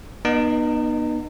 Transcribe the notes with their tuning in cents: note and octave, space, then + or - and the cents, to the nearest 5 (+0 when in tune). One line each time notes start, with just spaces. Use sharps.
B3 -35 D#4 -35 D#5 +0